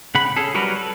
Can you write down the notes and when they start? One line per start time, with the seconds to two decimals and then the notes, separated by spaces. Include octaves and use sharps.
0.15 C#3 F#5 B5
0.36 C#4 G#4 A4
0.54 F#3 G3 F#4 A#4 B4
0.76 A4 B4